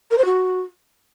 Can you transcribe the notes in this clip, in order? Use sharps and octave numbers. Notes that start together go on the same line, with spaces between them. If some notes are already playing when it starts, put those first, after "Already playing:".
A#4
C5
F#4